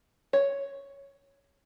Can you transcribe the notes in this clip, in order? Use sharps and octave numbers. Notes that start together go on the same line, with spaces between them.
C#5